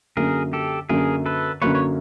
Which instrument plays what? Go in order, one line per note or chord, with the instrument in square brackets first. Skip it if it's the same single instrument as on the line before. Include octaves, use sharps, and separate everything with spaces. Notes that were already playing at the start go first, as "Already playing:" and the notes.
[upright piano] F#2 D3 F#3 A#3 [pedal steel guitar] G#4 A#4
[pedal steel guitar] G4 A4
[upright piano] F#2 D3 F#3 A#3 [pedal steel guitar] G#4 A#4
[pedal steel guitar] A4 B4
[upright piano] F#2 D3 F#3 A#3 [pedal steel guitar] B4 C#5
[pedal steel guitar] C#5